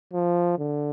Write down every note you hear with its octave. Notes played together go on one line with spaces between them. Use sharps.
F3
D3